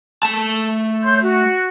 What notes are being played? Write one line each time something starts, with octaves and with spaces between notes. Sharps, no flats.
A3 A5
C#5 C6 G6
F#4